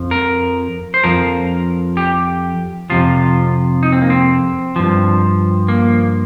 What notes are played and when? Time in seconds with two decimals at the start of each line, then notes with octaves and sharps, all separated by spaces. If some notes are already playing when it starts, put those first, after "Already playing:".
Already playing: F2 F3
0.11 A#4
0.94 C5
1.04 F2 F3 A#4
1.97 G4
2.90 F2 C3 F3 F4
3.83 D#4
3.92 C4
4.02 A#3
4.10 C4
4.76 G2 F3
5.68 A#3